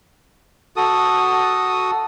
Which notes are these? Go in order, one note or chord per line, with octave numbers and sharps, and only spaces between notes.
F#4 A4 D#6